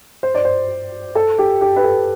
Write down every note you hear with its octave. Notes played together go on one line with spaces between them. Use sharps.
C5
D5
C5
A4
G4
G4
B4
A4